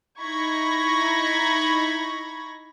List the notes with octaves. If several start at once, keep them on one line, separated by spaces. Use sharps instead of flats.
D#4 E4 B5 C#6 G#6 A#6